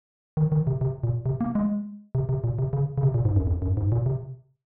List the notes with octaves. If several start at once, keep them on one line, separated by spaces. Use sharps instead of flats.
D#3
D#3
C3
C3
A#2
C3
A#3
G#3
C3
C3
A#2
C3
C#3
C#3
C3
A#2
G#2
F#2
F2
F#2
G#2
A#2
C3